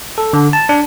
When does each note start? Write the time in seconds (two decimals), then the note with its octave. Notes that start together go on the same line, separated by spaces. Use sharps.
0.18 A4
0.33 D3
0.53 A5
0.69 D4